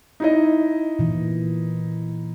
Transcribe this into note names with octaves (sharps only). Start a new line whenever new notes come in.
D#4 E4 D#5
A#2 E3